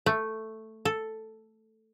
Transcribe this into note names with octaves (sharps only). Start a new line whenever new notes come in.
A3
A4